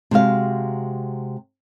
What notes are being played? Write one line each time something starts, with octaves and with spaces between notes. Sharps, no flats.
C3 G#3 F#4 F5